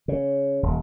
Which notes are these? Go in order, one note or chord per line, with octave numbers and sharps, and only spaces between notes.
C#3
D#1